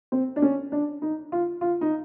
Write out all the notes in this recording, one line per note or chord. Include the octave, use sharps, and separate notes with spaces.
C4
D4
C#4
D4
D#4
F4
F4
D#4